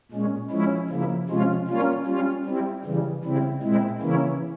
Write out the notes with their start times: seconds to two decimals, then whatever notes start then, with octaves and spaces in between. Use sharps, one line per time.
0.11 A#2 G#3 C#4
0.50 F3 G#3 C#4 E4
0.89 C#3 F3 A#3 E4
1.29 C3 F3 G#3 C#4 F4
1.67 G3 A#3 C#4 F4
2.07 G3 C#4 F4
2.45 G3 C4 E4
2.85 C#3 E3 G3
3.24 C#3 G3 C4 E4
3.63 A#2 G#3 C4 E4
4.01 C#3 E3 A#3 C#4 E4